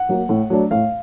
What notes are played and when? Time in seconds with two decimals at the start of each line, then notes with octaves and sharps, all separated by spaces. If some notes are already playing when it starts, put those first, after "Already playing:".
Already playing: F#5
0.09 F#3 A#3
0.29 A2
0.50 F#3 A3 D4
0.71 A2 F5